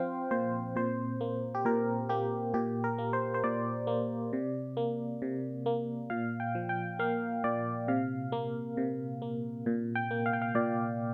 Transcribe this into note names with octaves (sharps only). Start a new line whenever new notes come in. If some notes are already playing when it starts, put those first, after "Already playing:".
Already playing: F3 C4 C5 F5 G5
A#2 C5
A#2 C5
A#3
G4
A#2 A#4
A#3 G4
A#2 G4
A#4
A#3
C5
C5
A#2 D5
A#3
C3
A#3
C3
A#3
A#2 F5
G5
F3
G5
A#3 F5
A#2 D5
C3 F5
A#3
C3
A#3
A#2
G5
A#3
F5
G5
F5
A#2 D5